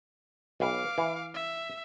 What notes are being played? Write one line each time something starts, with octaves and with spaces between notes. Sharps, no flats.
B1 B4 F5 D6
E3
E5